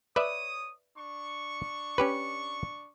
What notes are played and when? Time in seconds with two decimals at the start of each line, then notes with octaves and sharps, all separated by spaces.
0.16 B4 C#5 D5 E5 D#6
0.97 D4 C#6
1.98 C#4 G4 B4